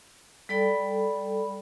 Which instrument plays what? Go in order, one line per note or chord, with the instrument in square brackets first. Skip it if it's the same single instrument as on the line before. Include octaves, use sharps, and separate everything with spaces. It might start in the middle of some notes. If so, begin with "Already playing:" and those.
[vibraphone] G3 A4 D5 G5 B5